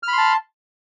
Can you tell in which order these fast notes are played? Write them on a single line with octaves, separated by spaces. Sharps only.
F6 B5 C6 A5